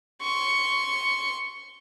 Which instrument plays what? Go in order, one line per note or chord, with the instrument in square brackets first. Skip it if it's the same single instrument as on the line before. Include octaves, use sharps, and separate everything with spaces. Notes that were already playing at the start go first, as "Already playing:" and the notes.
[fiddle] C6 C#6